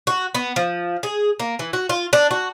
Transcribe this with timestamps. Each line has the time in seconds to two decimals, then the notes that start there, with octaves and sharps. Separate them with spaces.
0.07 F#4
0.35 B3
0.56 F3
1.03 G#4
1.40 A#3
1.59 E3
1.73 F#4
1.89 F4
2.13 D4
2.31 F#4